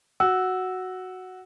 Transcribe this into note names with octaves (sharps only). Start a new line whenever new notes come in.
F#4 E6